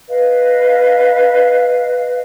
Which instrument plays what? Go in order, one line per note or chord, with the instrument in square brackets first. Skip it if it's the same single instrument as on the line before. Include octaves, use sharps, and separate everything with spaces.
[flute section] B4 D#5 F5